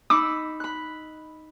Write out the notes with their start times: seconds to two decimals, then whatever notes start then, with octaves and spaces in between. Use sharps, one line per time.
0.10 D#4 B5 D6 E6
0.60 B5 F#6